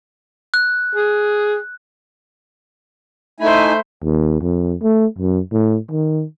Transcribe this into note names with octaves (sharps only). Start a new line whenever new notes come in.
F#6
G#4
A3 D#4 E4 C5 G#5 B5
D#2
F2
A3
F#2
A2
D#3